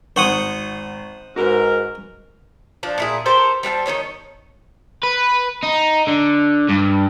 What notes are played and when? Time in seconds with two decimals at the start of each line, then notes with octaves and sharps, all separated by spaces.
0.16 G#1 C5 F#5 C#6 D#6
1.36 G#2 F#4 A#4 B4
2.83 F3 D4
2.98 A#2 E4 G#4
3.26 G4 A4 A#4 C5
3.63 G3 C4 F#5 A5
3.86 D#3 C#4 D#4 C#5
5.03 B4
5.64 D#4
6.08 D3
6.69 G2